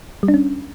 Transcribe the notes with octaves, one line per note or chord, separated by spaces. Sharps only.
G3
D4
C#4